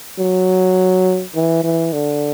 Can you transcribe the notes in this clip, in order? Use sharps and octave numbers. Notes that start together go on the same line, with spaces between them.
F#3
E3
E3
D3